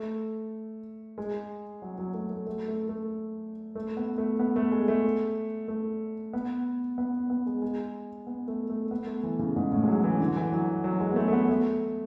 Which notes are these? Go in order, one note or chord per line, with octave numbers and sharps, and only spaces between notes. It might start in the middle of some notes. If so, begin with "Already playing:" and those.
Already playing: A3
G#3
F#3
F#3
A3
A3
A3
A3
A3
A3
B3
A3
B3
A3
G#3
A3
A3
B3
B3
B3
G#3
G#3
B3
A3
A3
B3
A3
E3
C#3
G#2
A2
G#3
F#3
E3
D3
E3
F#3
F#3
G#3
B3
A3
A3
B3
A3